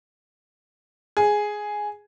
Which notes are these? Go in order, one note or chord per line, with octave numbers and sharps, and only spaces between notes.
G#4